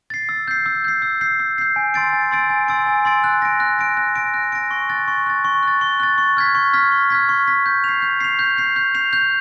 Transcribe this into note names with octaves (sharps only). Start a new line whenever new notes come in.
A6 C7
E6
G6 C7
E6
G6 C7
E6
G6 C7
E6
G6 C7
G#5
C6 E6 A6 D7
G#5
C6 E6 A6 D7
G#5
C6 E6 A6 D7
G#5
C6 E6 A6 D7
F#6
A#6 D7
F#6
A#6 D7
F#6
A#6 D7
F#6
A#6 D7
C#6
F#6 A6
C#6
F#6 A6
C#6
F#6 A6
C#6
F#6 A6
C#6
F6 G#6 B6
C#6
F6 G#6 B6
C#6
F6 G#6 B6
C#6
F6 G#6 B6
G6
C7 F7
G6
C7 F7
G6
C7 F7
G6
C7 F7
G6